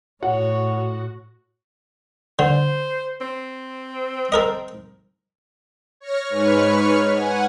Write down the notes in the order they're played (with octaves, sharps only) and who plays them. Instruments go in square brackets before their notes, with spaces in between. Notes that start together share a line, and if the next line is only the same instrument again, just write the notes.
[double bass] A2 [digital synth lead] F#4 [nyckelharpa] C#5 [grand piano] F#5
[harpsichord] D3 [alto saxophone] C5
[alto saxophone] C4
[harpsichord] A4 A#4 D#5
[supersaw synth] C#5 C#6 F6 A#6
G#2 B4 C#5 C#6 F6
F#5 G#5